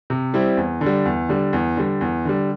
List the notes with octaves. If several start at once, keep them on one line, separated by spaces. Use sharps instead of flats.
C3
G3 C4 E4
E2
D3
G3
E2
D3 G3
E2
D3 G3
E2
D3 G3